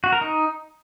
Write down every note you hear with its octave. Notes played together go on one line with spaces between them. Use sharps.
F#4
A#4
D#4